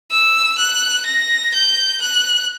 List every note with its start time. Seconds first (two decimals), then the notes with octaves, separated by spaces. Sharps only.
0.12 E6
0.58 F#6
1.06 A#6
1.54 G6
2.01 F#6